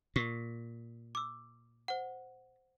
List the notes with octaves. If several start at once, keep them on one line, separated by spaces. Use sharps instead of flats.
A#2 C#6 C7
D6 E6
C5 F#5